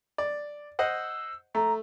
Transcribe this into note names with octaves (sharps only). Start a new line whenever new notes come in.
D5
C5 D#5 F#5 E6
A3 A#5